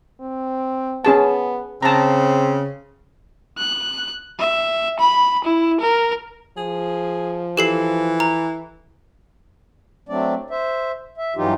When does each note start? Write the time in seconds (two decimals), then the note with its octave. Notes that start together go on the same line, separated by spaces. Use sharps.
0.21 C4
1.05 B3 C#4 G#4 A5
1.82 C#3 C4 A5 A#5
3.58 F#6
4.39 E5
4.99 B5
5.44 E4
5.81 A#4
6.57 F3 G#4
7.57 E3 G4 A4 C7
8.20 A#5
10.09 F#3 A3 C4 D4 D5
10.50 C5 E5
11.17 E5
11.36 G2 E3 F#3 D#4 F4 G4